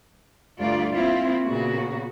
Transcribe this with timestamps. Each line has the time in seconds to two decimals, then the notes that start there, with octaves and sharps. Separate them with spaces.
0.60 D2 G2 A3 F4 D5
0.94 A#3 C4 E4 F4
1.45 A#2 C#3 B3 F#4